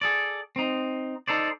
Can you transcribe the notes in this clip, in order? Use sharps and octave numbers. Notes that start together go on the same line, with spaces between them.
G#4 A4 D5
C4 D#4
D#4 A4 C5 D5